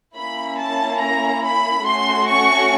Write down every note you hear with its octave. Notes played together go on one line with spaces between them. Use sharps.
A#3 C#4 E4 B5
A5
A#5
B5
A3 C#4 F#4 C6
C#6